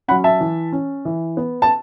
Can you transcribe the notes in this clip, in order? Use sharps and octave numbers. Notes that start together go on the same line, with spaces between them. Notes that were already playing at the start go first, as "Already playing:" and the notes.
F#3 C#4 F#5 B5
E5 A5
E3
C#4
E3
B3
A5